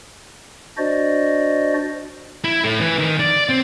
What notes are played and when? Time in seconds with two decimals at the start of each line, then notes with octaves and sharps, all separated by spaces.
0.77 D4 F#4 C5 D5 D#5
2.44 E4
2.64 A2
2.80 E3
2.98 D#3
3.20 D5
3.49 C4